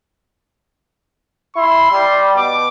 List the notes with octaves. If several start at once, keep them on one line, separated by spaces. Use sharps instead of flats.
E4 C6
G3
B2 D6